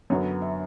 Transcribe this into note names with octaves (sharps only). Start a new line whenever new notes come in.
F#2 D3 F#3 B3 C#5
E5